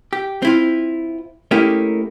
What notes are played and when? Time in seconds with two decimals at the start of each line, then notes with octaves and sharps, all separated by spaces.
0.13 G4
0.42 C4 E4 F4
1.51 A3 A#3 C#4 D#4 E4 G4